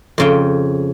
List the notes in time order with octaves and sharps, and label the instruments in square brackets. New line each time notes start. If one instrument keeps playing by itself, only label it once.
[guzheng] F2 C#3 G5